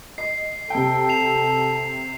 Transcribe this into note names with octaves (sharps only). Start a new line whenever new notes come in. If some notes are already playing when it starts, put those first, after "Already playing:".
D#5 C7
C3 A4 G5
C7 E7 F7